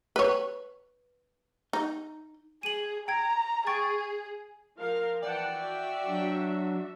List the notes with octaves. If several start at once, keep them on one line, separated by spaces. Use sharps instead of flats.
B4 C#5
D#4
G#4 D#7 F#7
G5 A#5 G#6
G#4 G5 C#6 A6
F3 A#4 F5
E3 D5 F#5 G5 A5
F#4 E5
F#3 D4